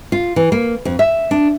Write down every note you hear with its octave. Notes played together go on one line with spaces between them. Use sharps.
F4
E3
A#3
F2
E5
D4